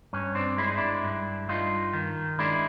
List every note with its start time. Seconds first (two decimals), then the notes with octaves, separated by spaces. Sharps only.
0.13 G2 C#4
0.35 C4 D4
0.58 G#3 E4
0.68 D#4
0.77 D4 E4
1.04 G2
1.49 G2 D#4 F4
1.93 D#3
2.39 G#3 D4 E4